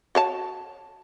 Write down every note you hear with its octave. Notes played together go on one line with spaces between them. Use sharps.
F#4 C#5 A5